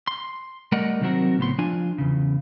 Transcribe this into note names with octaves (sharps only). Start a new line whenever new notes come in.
C6
G3 A3 A#4 D5 D#5 F#5
C3 D#3 F#3 C4 F#4 A#4
C#2 A2 B3 C6
F3 D4 F4 G#5
E2 C#3